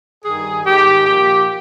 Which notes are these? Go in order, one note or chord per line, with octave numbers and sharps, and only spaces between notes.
G2 D#3 G3 G#4
G#2 D#3 G#3 G4
A#2 F3 A#3 G4